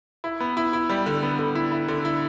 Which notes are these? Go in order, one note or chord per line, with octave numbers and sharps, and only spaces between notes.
E4
B3
E4
E4
G3
D3
B3
D3
E4
E4
D3
E4